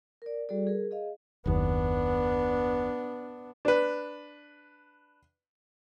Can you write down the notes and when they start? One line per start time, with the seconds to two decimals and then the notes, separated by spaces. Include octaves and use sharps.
0.22 A#4 D5
0.49 G3 F#4 G#4 A4 D5
0.67 G#4 A#4
0.91 G#4 D#5 F5
1.46 F#1 D#2 B3 D4
3.65 D4 B4